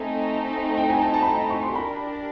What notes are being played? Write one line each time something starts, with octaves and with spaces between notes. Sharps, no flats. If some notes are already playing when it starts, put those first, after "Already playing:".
Already playing: A3 C4 D#4 G#5
G5
G#5
A5
A5
B5
A#5
C#6
C6
D4 G4 A#4 D5 B5